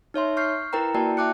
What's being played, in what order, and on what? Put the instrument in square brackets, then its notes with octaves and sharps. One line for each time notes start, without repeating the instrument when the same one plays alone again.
[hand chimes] D#4 C#5 E5 C6
C#6 F6 G6 C7
E4 A#4 B4 G5 A#5
A#3 E4 F#4 D5 G5 A5
E5 G5 A5 D6 F#6 C#7